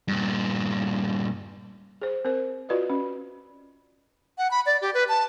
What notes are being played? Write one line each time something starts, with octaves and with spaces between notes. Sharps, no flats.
G2 A#2
G#4 C5
C4 A#4 C5
F4 F#4 B4 D5 D#5
C#4
F#5
B5
D5
G4
B4
A5